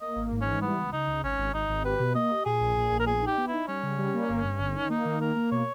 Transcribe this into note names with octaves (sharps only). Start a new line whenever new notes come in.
A#3 D#5
G#1
G#2
E3 C#4
G3 B3
C#2
C#3 D#4
C#2
G#1 C#4
G#1
G#1 D#4
G#1
G4 B4
B2
A#3 D#5
G4
A#2 G#4
A#1
A#2
A#1
A#4
B3 G#4
D#4
G4
B3
E4
D#4
G3 C#4
C#3
G3
A#3
G1
G2
G1
D#3
A#3 D#4
D#3
A#3 A#4
A#3
B2 C#5